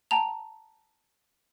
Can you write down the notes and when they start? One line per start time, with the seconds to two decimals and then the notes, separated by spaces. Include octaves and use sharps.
0.11 G5 A5 A#5 F7